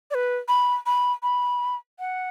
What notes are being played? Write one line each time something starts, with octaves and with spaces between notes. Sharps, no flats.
D5
B4
B5
B5
B5
F#5